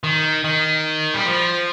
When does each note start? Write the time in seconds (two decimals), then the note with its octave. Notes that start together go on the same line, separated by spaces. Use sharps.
0.04 D#3
0.44 D#3
1.14 G3
1.26 F3